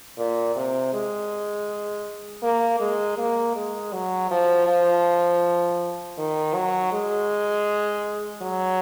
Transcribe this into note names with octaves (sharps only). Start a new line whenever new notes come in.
A#2
C3
G#3
A#3
G#3
A#3
G#3
F#3
F3
F3
D#3
F#3
G#3
F#3